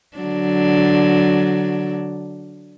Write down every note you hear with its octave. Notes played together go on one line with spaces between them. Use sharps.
D3 F#3 D4